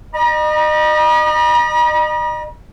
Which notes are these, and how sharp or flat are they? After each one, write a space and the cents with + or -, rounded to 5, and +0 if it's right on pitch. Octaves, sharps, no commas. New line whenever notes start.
D#5 -35 A#5 +45